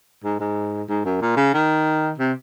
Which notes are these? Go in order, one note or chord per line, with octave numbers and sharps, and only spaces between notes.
G#2
G#2
G#2
F#2
A#2
C#3
D#3
C3